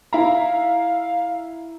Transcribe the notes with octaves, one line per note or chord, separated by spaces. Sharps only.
E4 E5 F5 A#5